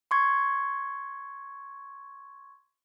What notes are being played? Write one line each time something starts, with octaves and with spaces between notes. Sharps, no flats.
C6 C#6 G#6